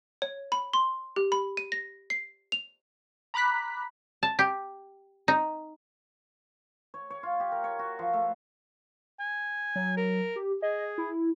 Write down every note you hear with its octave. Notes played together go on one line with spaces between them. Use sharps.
C#5
B5
C6
G4
B5
D#7
A#6
C7
F7
A#5 B5 D6 F#6 B6
A5
G4
D#4
C#5
C#5
F4
G4
A#4
C#5
F#4
F3
A3
G#5
F#3
A#4
G4
G#4 D#5
E4